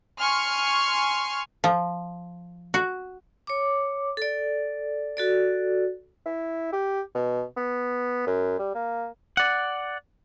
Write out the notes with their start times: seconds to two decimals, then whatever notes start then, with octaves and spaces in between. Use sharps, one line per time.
0.20 G#5 C6 C#6 F6
1.64 F3
2.74 F#4
3.47 C#5 D6
4.17 A4 D5
5.17 F#4 A4 D5
6.26 E4
6.73 G4
7.15 B2
7.57 B3
8.27 F#2
8.59 G3
8.75 A#3
9.37 D5 F#5